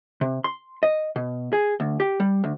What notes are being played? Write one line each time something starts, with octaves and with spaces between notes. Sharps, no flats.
C3
C6
D#5
B2
G#4
D2
G4
G3
D2